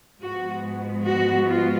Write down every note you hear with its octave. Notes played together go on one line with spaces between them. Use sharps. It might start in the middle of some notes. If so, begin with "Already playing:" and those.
G#2 F3 G#3 B3 F#4
F#4
F4